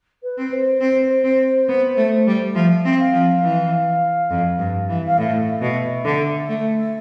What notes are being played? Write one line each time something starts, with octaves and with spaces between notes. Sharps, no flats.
B4
C4
C5
C4
C4
B3
A3
G3
F3 E5
C4
F5
F3
E3
F2
G2
E3
F5
A2 E5
B2
D3
A3